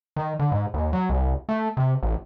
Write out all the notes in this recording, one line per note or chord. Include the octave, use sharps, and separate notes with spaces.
D#3
D3
G#2
D#2
F#3
C2
A3
C3
A1